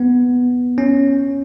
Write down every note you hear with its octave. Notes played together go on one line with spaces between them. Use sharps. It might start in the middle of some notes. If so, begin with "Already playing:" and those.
Already playing: B3
C#4